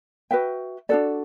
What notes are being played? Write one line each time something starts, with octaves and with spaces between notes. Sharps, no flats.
F#4 B4 E5 G5
D4 F#4 A4 D5